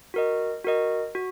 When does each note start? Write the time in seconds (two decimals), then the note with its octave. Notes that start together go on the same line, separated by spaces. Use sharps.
0.14 F#4 A#4 D#5
0.64 F#4 A#4 D#5
1.15 F#4